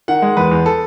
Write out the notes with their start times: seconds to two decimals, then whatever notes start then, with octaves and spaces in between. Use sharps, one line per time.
0.08 D#3 F#5
0.22 G#3
0.37 E2 B4
0.51 E2
0.66 A4